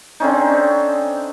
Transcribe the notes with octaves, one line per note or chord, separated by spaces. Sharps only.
D3 C4 C#4 D#4